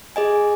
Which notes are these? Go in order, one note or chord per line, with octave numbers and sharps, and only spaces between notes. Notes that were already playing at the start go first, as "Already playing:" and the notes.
G#4 D#5 G#5